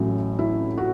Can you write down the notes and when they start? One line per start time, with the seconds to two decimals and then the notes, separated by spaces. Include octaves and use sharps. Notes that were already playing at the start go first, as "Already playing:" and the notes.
Already playing: A1 A2 F#3 C#4
0.39 E4
0.78 F#4